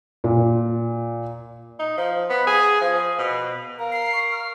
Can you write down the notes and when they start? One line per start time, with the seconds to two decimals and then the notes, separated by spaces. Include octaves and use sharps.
0.24 A#2
1.80 D#4
1.98 F3
2.30 B3
2.47 G#4
2.81 F3
3.19 B2
3.79 A#4 F5
3.92 C7
4.13 C#6
4.32 F6